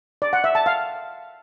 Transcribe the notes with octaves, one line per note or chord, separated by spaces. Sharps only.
D5
F#5
E5
A5
F5